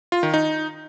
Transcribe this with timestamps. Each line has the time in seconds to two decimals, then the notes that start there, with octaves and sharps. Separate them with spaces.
0.12 F4
0.23 D#3
0.34 D#4